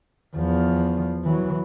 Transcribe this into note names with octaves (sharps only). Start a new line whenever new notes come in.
E2 F3
E3 F#3